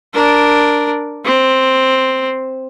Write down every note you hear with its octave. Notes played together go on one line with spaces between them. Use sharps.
D4 A#4
C4